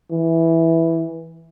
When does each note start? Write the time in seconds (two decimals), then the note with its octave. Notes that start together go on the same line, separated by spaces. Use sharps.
0.12 E3